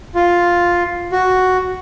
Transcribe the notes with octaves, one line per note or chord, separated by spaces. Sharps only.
F4
F#4